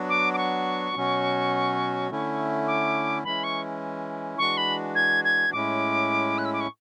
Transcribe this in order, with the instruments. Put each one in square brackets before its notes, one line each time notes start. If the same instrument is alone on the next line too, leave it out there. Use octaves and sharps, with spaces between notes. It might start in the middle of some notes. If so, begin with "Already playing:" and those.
Already playing: [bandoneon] F#3 B3 D4 F#4
[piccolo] D6
D6
C#6
[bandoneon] B2 F#3 C#4 F#4
D3 A3 C#4 E4
[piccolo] D6
[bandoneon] E3 G#3 C#4 E4 [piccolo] B5
[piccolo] C#6
[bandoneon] E3 G#3 D4 F#4 [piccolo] C#6
[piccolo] B5
G#6
G#6
[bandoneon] A2 G#3 C#4 E4 [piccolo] D6
[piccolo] F#6
E6
D6
C#6